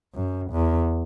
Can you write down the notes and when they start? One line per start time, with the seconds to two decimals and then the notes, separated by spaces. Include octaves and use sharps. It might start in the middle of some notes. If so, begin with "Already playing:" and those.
0.15 F#2
0.51 E2